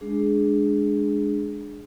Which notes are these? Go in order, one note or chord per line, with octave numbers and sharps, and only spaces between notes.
G#3 D4 G#4